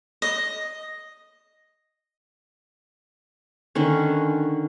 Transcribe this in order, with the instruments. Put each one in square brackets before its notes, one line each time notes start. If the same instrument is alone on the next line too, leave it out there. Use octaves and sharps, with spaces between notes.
[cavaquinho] D#5
[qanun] D3 D#3 C#4